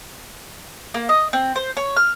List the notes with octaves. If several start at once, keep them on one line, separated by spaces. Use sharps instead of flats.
A#3
D#5
C4
C5
C#5
F6